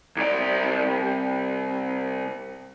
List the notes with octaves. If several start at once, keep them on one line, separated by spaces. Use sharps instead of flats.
C2 D5